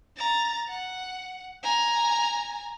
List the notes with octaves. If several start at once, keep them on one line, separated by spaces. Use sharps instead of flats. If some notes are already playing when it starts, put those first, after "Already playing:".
A#5 A6
F#5
G#5 A#5